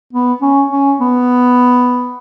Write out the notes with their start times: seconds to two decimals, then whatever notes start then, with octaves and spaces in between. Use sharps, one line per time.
0.13 B3
0.42 C#4
0.71 C#4
1.01 B3